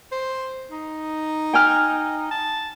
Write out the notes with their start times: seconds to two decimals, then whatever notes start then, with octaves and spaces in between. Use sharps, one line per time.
0.12 C5
0.71 D#4
1.53 G5 G#5 F6
2.31 A5